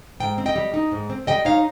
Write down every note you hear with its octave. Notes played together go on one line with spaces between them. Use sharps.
G#2 G5
C4
D#5 G5
G3
D#4
G#2
C4
G3 D#5 G5
D#4 C#5 F5